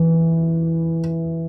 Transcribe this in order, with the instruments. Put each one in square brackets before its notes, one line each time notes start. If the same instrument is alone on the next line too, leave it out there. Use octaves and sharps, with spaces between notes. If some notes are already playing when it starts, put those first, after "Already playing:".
Already playing: [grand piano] E3